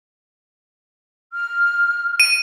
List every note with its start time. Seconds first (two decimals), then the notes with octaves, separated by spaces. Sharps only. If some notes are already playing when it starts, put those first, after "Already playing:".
1.34 F6
2.20 D#7